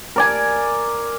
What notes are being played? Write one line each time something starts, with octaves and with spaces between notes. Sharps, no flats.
A#4 D5 G#5